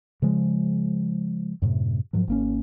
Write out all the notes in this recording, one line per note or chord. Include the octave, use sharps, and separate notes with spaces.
C#3 F3 G#3
F#2 A2 C3
G#2 F3 F#3
G#1 A#3 C#4